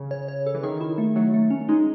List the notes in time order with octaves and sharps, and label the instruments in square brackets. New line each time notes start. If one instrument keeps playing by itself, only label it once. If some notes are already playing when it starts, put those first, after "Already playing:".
Already playing: [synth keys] C#3
[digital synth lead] C#5
C#5
A4
[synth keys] E3
[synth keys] D#3 [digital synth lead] G#4
[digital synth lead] E4
A3
[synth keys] F#3 [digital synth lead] A3
[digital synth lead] A3
C#4
[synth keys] G#3 [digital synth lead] D#4